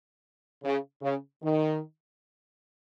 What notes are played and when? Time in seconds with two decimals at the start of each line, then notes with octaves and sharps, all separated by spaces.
0.63 C#3
1.02 C#3
1.43 D#3